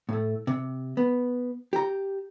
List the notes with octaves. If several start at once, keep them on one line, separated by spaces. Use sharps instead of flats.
A2 A3
C3
B3
G4 A#5